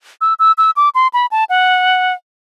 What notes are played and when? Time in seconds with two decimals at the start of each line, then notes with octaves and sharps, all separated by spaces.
0.21 E6
0.39 E6
0.58 E6
0.76 D6
0.95 C6
1.14 B5
1.31 A5
1.49 F#5